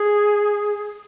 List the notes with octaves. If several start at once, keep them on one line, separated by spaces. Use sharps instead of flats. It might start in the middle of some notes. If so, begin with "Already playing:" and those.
Already playing: G#4